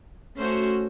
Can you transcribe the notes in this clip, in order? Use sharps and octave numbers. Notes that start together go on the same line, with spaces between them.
A3 C#4 F#4 C5